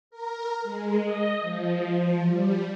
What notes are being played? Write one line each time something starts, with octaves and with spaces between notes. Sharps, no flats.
A#4
G#3
D#5
F3
G3